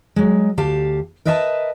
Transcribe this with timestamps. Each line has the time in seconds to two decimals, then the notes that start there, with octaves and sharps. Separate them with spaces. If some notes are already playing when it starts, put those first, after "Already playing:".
0.16 F#3 G#3
0.58 D2 G4 F5 A5
1.25 A#4 B4 D#5 E5 G#5 A5